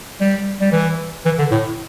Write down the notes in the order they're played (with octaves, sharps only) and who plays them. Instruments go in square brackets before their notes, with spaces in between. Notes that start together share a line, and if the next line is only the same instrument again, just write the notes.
[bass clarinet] G3
G3
E3
E3
D3
A2